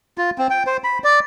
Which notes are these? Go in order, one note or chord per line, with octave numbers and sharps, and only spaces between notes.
F4
C4
G5
C5
B5
D5